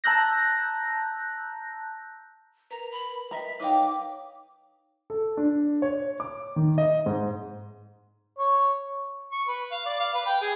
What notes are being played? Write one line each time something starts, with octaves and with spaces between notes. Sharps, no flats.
A5 A#5 E6 F#6 G6 A#6
A#4 B4 A#5
B5
D#5 E5 A#5
D#4 B4 C#5 D#5 F5 G5 D6
A4
D4
C#5
D6
D#3
D#5
G#2
C#5
C#6
B4
F5
D5
F5
B4
G5
G#4